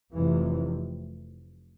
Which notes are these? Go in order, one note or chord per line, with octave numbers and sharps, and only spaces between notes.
F1 F2 C3 E3